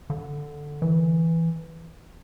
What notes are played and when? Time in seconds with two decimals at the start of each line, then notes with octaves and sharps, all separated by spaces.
0.10 D3
0.82 E3